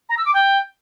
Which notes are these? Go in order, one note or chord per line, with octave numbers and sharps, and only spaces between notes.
A#5
E6
D6
G5